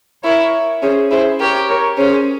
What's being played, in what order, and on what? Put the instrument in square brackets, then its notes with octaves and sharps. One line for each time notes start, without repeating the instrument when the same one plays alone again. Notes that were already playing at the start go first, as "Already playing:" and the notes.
[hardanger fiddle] E4 [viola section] A#4 C#5
[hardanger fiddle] C#4 [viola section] G#4 C5
[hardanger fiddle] E4 [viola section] G#4 C5
[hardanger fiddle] G4 [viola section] A#4 C#5
[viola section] A#4 C#5
[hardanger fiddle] C#4 [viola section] G#4 C5